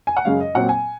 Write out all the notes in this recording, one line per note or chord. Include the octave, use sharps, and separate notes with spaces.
G#5
F#5
F#2 C#3 G#3 C#4 F5
D#5
A#2 F#3 C4 F#5
G#5